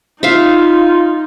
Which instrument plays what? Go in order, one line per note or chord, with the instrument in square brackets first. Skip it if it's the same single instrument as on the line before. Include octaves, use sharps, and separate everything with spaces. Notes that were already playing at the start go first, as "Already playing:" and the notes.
[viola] D#4 [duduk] F4 [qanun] E5 F5